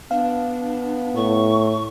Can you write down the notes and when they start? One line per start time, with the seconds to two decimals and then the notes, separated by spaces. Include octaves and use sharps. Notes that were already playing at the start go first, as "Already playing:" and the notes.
0.11 B3 D4 F5
1.15 A2 C#6